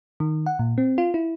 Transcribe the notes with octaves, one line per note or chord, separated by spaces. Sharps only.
D#3
F#5
A#2
C4
F4
E4